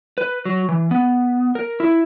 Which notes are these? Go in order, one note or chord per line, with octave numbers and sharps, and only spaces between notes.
B4
F#3
E3
B3
A#4
E4